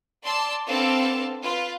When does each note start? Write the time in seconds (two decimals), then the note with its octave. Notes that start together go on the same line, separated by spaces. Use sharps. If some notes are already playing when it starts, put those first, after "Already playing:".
0.25 D5 A5 C6 E6
0.66 B3 C4 D4 A4 F5 A5
1.43 F4 B4